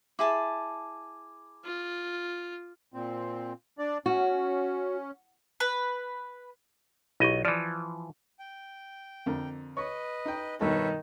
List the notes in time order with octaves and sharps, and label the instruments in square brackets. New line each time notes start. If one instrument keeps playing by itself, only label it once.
[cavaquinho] E4 G#4 A5 [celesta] D6
[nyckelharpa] F4
[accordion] A#2 C4
D4 D5
[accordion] C#4 [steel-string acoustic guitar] F#4
[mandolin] B4
[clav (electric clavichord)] B1 D#5 [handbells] E4 G4 C#6
[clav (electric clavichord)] E3 F3 [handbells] D5 F6
[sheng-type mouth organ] G5
[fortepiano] F2 D3 A#4
[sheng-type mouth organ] B4 D#5 [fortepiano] C#5
[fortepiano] D#4 G5
[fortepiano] G2 B2 A4 [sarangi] D#3 [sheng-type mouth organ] B4 C#5 E5